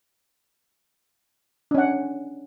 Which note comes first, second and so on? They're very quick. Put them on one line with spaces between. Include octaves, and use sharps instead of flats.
D4 C#4 F#5